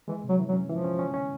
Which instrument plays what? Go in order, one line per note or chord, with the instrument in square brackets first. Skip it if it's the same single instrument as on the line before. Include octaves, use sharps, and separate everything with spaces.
[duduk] E3 [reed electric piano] G#3
[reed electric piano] C3
[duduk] F#3
[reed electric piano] E3
[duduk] F#3
[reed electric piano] C#4
[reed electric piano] E3 [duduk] F3
[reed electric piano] C#4
C#4
C#4